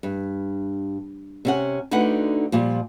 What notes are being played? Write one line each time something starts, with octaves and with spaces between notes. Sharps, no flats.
G2
C3 C#4 F#5
D2 D3 D#4 B4 F#5
A#2 F3 G3